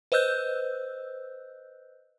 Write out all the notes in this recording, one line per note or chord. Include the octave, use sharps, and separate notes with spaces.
B4 C5 D#5 E6 F#6 G6